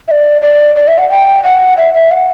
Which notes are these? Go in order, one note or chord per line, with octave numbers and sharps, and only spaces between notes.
E5
D5
D5
D5
E5
F#5
G5
F#5
E5
E5
F#5